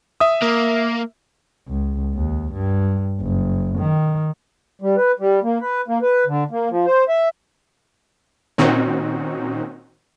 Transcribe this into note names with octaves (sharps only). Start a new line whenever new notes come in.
E5 D#6
A#3
C#2
D#2
G2
F#1
D#3
G3
B4
G3
A#3
B4
A#3
B4
D3
A#3
F3
C5
E5
A#2 D#3 C4 C#4 D#4 F#4